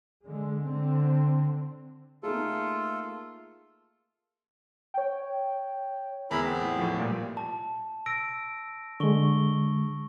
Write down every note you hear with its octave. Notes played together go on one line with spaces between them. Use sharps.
D3 G#3
D3 C4
A3 A#3 D#4 F4 G#4 A4
C#5 G5
E2 E4 A#4 B5
B3 C4
A2
A2 F3
A#2 G3
A5
E6 A#6 D7
D3 G#3 C#6 G7